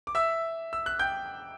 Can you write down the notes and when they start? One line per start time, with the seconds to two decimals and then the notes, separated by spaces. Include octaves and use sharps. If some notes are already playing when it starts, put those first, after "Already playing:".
0.07 D6
0.15 E5 E6
0.73 E6
0.86 F#6
0.99 G5 G6